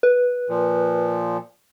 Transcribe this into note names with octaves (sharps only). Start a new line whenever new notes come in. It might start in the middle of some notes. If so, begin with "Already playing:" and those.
B4
A#2 F3